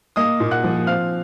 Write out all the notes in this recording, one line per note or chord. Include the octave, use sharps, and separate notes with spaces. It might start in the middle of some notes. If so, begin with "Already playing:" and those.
A#3 D#5 D#6
A#2
F#5 F#6
F3
C4 F5 F6